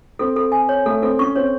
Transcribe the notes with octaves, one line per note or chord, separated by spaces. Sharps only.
C4 A4
A4
G#5
C#5
A3 A4
C4 A4
C#4 C#6
C4 C#5